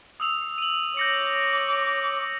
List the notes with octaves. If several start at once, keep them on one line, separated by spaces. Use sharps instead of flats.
D#6 E6 F7
D#7 F#7
C#5 D6 G6 A#6 C#7